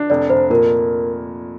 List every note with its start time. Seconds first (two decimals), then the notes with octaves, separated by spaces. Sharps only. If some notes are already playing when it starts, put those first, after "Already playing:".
Already playing: D4
0.10 F1 D5
0.30 F1 C5
0.50 A#2 A#4